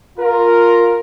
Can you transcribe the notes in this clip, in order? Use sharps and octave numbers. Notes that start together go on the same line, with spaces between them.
F4 A#4